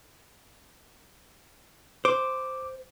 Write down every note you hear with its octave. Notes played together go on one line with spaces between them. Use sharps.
C5 D6